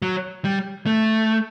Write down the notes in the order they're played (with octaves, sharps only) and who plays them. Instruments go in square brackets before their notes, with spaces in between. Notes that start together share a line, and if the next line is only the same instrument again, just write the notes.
[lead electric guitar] F#3
G3
A3